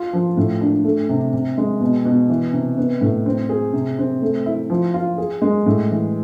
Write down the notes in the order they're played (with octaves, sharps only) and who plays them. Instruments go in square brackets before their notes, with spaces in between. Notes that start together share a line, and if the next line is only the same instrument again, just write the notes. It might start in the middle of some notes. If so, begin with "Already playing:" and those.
Already playing: [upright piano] F4
F3
A2
D4
A3
C3
C3
G#3
B2
B2
E3
C3
B3
A2
C4
G#4
C3
C4
A3
E4
F3
F4
G#4
G#3
A2
E3